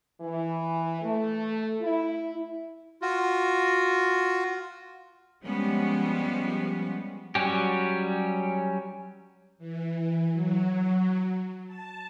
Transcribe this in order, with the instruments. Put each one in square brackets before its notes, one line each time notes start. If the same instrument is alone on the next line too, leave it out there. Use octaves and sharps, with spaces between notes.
[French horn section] E3
A3
E4
[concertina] F4 F#4
[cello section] F3 G3 G#3 B3 C#4
[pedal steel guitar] F#3 G3 C#4 G4
[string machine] E3
F#3
A5